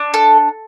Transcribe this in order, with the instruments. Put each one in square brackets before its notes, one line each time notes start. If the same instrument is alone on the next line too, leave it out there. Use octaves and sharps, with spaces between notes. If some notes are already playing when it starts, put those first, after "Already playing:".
Already playing: [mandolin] D4
A4